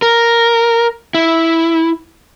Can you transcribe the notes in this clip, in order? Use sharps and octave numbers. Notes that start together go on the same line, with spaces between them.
A#4
E4